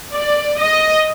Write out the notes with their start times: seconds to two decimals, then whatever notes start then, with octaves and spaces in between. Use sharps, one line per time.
0.13 D5
0.60 D#5